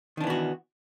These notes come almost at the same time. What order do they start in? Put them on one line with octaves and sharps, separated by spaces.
D#3 D4 E3 B3 F#4